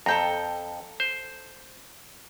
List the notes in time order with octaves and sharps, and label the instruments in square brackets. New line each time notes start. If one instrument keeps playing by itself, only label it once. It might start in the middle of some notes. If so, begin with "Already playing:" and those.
[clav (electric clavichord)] F2 [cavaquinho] A4 G5 A#5
[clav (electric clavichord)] C5